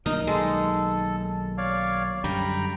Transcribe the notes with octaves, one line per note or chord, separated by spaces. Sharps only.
B1 D#3 A#3 D#4 D#6 F6
G#3 A4
C#5 D5 F5
F#2 D3 G3 G5 A#5 B5